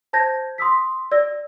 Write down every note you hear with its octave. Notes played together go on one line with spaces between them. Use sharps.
C5 A5 G6 G#6 A#6
C6 D#6 E6 B6
D5 E6 A#6